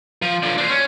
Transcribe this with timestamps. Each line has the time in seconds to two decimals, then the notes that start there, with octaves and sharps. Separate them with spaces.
0.22 F3
0.43 D3 F3
0.58 D4 C5
0.70 C#4